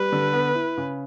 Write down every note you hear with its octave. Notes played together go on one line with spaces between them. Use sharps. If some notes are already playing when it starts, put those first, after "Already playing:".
Already playing: G3 B4
D3
B3
E4
C#3